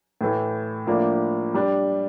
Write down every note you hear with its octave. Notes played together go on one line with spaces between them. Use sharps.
A2 E3 A3
A2 F3 A#3 D4
G3 D4 G4